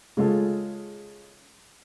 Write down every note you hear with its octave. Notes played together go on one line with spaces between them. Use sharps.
C#3 G#3 F4 A4